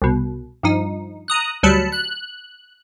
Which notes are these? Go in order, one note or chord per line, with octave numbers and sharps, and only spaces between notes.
C2 B2
G2 F3 D#4
A#5 D#6 F#6
D2 F#3 G3 A5 B5 C#7
F#6